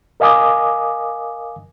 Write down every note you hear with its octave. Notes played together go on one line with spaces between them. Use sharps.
A#4 D#5 F5 G#5 D6 D#6